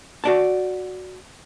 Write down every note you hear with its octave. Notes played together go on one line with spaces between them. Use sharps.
F#4 D5 A5